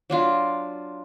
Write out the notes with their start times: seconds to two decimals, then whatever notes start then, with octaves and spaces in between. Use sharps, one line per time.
0.10 F#3 D4 F4